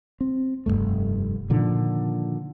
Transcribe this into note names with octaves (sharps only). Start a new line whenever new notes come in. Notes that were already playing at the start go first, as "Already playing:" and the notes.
C4
F1 E2 G2 A3
A#2 D3 D#3 F3